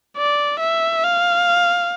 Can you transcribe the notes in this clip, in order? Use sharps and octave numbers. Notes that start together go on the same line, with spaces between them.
D5
E5
F5